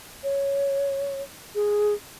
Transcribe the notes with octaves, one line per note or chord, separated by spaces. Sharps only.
C#5
G#4